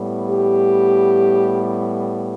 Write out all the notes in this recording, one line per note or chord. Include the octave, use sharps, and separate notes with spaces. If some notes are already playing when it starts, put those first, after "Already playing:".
Already playing: A2 G3 B3
G4